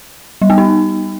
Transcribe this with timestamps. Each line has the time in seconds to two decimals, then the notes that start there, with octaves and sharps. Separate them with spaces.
0.42 G3
0.50 B3
0.58 D#4